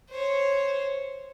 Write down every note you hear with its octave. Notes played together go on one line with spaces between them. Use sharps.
C5 C#5